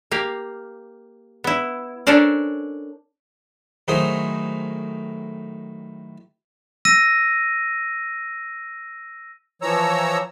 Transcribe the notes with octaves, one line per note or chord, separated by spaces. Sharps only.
A#3 G4 F5
B3 E4
C#4 D4 A4 A#4 C5 D5
A2 D#3 F#3 G#4 C5 D#6
E6 A#6 D#7
E3 F3 C#5 A#5 E6